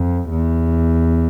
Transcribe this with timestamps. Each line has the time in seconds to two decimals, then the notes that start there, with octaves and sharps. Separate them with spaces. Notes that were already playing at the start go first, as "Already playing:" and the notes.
Already playing: F2
0.31 E2